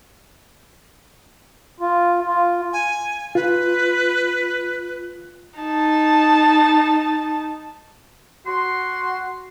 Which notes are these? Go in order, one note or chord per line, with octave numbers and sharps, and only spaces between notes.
F4
F4
G#5
F4 B4
D#4 A5
F#4 C6